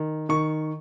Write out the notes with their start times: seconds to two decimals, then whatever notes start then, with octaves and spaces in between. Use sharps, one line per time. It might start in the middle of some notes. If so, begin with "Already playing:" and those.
Already playing: D#3
0.29 D#3 C#6